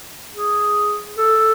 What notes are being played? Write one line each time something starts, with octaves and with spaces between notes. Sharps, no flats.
G#4
A4